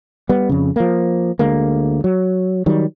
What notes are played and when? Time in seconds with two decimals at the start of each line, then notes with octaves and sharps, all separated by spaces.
0.29 G3 B3
0.49 F2 C#3
0.76 F3 A#3
1.39 D2 D3 G#3 A#3
2.04 F#3
2.66 D#3 F#3 G3